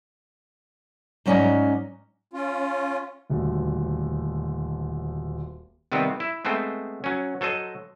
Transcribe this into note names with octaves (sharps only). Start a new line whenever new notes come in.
G#2 F#3 C#4 D5 D#5 A#5
C#4 F4
D#1 D2
C3 D#3 G3 B3 C4
E4
G#3 A3 B3 C4 C5
F#3 C#4
F#3 A4 C5 D#5